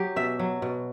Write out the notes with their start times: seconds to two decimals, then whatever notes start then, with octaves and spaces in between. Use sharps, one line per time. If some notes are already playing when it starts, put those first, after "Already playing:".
Already playing: F#3 G4
0.16 B2 E5
0.39 F#3
0.62 B2